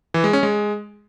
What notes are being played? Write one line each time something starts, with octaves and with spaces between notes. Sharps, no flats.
E3
G#3
C#4
G#3